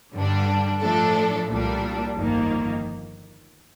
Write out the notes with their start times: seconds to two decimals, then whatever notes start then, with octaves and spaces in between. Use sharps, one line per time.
0.14 G2 D3 G3 D4
0.80 A2 F3 A3 D4 A4
1.47 C2 A#2 G3 D4
2.14 G1 F2 D#3 A#3